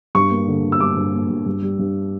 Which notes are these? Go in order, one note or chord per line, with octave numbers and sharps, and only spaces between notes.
G2 C#6
A#3
D3
D3
E6
G2 D6
G2
A#3
G2
G2
G3
G2